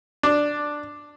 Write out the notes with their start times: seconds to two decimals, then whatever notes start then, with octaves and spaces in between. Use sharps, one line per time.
0.23 D4